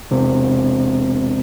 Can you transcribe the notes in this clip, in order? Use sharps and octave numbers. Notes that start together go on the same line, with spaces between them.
E1 C3